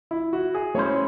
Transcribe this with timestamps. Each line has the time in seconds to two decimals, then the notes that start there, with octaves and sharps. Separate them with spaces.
0.11 E4
0.33 F#4
0.54 G#4
0.75 A3 C#4 E4 C5 C#5